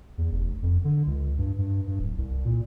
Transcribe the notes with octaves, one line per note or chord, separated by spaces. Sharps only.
E2
F1
F2
D3
C#2
G2
G2
G2
D1
C2
A#2